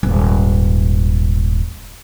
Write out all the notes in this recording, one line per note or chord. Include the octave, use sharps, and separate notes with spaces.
D#1 G#2